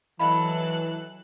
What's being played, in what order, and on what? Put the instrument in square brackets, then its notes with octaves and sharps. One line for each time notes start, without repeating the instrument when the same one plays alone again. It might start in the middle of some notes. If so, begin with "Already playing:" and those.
[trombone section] E3 [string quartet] F#3 A4 F#6 [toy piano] D#5 F5 B5